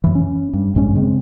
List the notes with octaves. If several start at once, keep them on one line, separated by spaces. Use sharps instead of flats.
F#2 E3
C#4
G2
A1 G2 G#3 C#4
C#3 G#3 C4